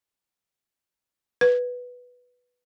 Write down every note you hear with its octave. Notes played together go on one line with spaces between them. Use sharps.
B4